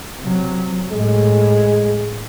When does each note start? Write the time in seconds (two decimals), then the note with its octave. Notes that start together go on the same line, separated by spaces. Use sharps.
0.22 C3 F#3
0.92 A2 G#3